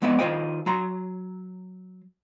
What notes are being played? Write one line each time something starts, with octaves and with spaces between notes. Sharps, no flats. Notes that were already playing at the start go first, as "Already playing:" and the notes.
F2 G#3 B3 D#5 E5 F#5
D#3 G#3 F4 C5 D#5 G5
F#3 A#5 C6